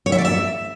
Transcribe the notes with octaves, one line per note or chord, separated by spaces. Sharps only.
C#5
E5
D5
E5